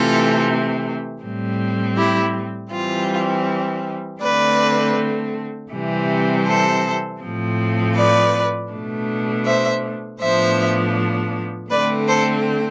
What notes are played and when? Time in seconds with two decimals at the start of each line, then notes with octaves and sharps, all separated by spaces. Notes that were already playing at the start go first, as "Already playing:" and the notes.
Already playing: C3 E3 A3 C4 F4 A4
1.22 A2 G3 C4
1.96 E4 G4
2.71 E3 G3 C4 F4
4.21 D3 A3 C4 B4 D5
5.71 C3 E3 G3 C4
6.45 A4 C5
7.21 A2 F3 C4
7.95 B4 D5
8.71 B2 A3 D4
9.46 C5 E5
10.20 A2 F3 B3 D4 C5 E5
11.70 D3 A3 C4 B4 D5
12.08 A4 C5